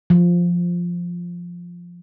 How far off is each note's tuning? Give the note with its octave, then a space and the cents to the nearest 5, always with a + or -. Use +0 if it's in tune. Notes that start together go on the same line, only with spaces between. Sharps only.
F3 +0